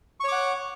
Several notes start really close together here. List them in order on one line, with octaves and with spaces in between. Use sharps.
C#6 C#5 D6 F#5